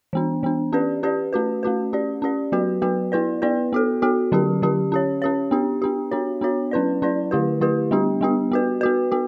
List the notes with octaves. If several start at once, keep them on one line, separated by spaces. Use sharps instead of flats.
E3 B3 D4
E3 B3 D4
C#4 G4 B4 D5
C#4 G4 B4 D5
A3 C#4 F#4 B4
A3 C#4 F#4 B4
C#4 G4 D5
C#4 G4 D5
F#3 B3 F#4 B4
F#3 B3 F#4 B4
B3 E4 B4 D5
B3 E4 B4 D5
B3 F#4 A4
B3 F#4 A4
D3 F#3 C#4 G4
D3 F#3 C#4 G4
C#4 G4 C#5
C#4 G4 C#5
B3 D4 G4
B3 D4 G4
B3 D4 F#4 C#5
B3 D4 F#4 C#5
F#3 C#4 E4 B4 D5
F#3 C#4 E4 B4 D5
D3 A3 E4 G4 B4
D3 A3 E4 G4 B4
G3 B3 D4 G4
G3 B3 D4 G4
B3 F#4 B4
B3 F#4 B4
B3 F#4